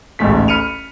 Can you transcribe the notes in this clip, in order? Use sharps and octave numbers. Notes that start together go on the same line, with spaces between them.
A1 D2 G#2 A3 B6
B5 F6 C#7 D#7 F7